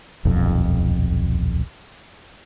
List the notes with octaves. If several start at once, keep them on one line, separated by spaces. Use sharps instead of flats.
D#1 B1 F2